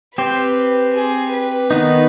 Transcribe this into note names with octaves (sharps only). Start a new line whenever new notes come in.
C4 G4 B4 C5
G#4
B4
D#3 B3 D#4